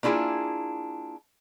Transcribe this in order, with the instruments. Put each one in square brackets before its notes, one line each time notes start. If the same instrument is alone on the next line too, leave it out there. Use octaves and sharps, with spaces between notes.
[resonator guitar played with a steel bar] A#3 D4 E4 F4 G#4